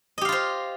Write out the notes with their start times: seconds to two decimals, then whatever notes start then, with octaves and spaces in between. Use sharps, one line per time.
0.18 D#5
0.21 G4
0.25 F5
0.29 F4
0.32 C5